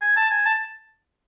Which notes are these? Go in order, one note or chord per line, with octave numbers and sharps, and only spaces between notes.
G#5
A5
G#5
A5